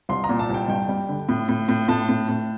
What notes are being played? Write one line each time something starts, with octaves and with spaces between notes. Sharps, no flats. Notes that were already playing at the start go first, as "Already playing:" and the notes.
C2 C6
A#5
A#2
A5
C2 G5
G2 G5
G3
D3
A2
A2
A2
A2 A5
A2
A2